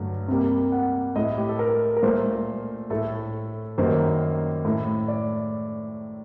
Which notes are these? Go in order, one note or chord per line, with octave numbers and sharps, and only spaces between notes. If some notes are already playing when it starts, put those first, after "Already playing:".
Already playing: G2 D3 F#3 A3
C3 G3 A#3
F#5
A2 A3 D#5
G4
A4
A#4
A#4
A#2 A3 C5
A2 A3 A4
F#2 D#3 G3 A#3 C5
A2 A3
D5